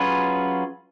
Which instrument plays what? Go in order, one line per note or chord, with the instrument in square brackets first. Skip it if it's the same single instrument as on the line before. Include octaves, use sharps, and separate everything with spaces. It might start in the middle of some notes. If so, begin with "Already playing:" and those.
Already playing: [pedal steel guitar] F#3 C#4 F4 G#4 B4